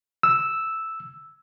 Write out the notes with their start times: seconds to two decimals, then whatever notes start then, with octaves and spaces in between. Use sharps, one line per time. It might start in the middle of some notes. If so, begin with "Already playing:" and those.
0.23 E6